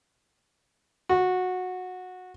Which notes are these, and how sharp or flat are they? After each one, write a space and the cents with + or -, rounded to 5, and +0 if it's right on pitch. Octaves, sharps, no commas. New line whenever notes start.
F#4 -15